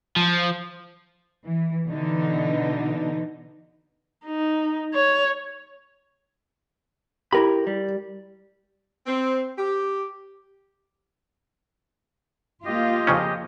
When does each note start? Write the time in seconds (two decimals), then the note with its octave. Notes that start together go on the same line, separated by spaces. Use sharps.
0.16 F3
1.46 E3
1.88 B2 D3 E3 D#4
4.26 D#4
4.94 C#5
7.33 E4 G4 A#4 B5
7.67 G3
9.07 C4
9.57 G4
12.65 A#3 F4 G4 D#5
13.07 F2 C#3 C#4